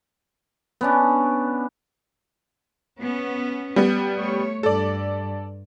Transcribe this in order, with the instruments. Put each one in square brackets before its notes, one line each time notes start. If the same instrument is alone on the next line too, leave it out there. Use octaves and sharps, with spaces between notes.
[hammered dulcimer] B3 C#4 D4
[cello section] B3 C#4
[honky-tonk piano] G3 B3
[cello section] A3 C#5
[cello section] G2 [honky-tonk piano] A4 D5